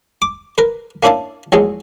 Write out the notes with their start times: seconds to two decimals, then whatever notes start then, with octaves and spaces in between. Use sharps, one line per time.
0.22 D6
0.58 A#4 B4
1.03 A#3 C#4 D4 E4 F5 A5
1.52 A#1 E2 F#3 G#3